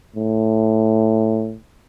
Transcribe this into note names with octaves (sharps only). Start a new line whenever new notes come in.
A2